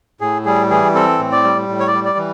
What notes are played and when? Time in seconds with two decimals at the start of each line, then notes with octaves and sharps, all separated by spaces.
0.21 A2 G#4
0.45 G3 G#4
0.70 E3 G#4
0.95 C4 A4
1.19 A2
1.32 D5
1.44 G3
1.69 A2
1.80 C#5
1.87 D5
1.93 G3
2.05 D5
2.18 E3